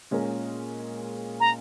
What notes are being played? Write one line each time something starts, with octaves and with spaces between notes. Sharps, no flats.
A#2 G#3 C#4 A#4
A#5